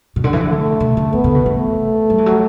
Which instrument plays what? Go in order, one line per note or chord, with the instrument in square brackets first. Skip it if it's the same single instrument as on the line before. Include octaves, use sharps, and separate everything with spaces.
[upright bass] B2
D3
E3
D3
[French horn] A3
[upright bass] B2
D3
[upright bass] E3 [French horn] B3
[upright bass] D3
B2
[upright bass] E3 [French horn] A3
[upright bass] F#3
E3
F#3